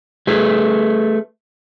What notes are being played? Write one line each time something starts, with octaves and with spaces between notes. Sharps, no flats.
A3 G#4 B4